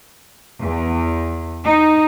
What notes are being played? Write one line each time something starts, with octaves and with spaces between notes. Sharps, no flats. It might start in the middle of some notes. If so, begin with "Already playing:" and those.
E2
D#4